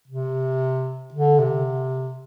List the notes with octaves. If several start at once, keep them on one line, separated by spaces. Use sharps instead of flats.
C3
D3
C3